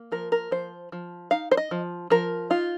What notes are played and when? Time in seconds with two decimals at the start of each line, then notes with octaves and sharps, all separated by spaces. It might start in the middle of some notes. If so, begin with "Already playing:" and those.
Already playing: A#3
0.12 F3 A#4
0.32 A#4
0.51 F3 C5
0.92 F3
1.31 D#4 F5
1.51 C5
1.57 D#5
1.71 F3
2.10 F3 A#4
2.50 D#4 F4